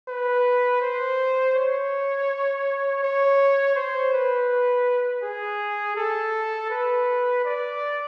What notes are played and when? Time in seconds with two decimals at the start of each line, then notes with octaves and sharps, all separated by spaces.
0.08 B4
0.82 C5
1.55 C#5
3.03 C#5
3.76 C5
4.13 B4
5.23 G#4
5.97 A4
6.71 B4
7.45 D5